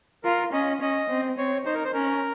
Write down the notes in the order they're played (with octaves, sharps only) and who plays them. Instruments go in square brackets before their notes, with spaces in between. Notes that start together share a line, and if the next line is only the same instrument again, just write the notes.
[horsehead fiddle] F4 [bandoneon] A#4
[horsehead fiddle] C#4 [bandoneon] D#5
[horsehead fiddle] C#4 [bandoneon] D#5
[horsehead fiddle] C4
[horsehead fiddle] C4 [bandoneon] C#5
[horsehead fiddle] D#4 [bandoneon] C5
[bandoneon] A#4
C5
[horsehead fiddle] C#4 [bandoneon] A#4